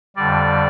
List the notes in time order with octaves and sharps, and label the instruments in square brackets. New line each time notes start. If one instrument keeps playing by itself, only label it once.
[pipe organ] F2 D3 G3 D5